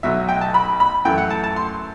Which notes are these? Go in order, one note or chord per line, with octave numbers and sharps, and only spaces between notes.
B1 B2 F#3 E5
G5
A5
B5
B5
F#2 E3 A3 E4 G5
F#5
A5
A5
C6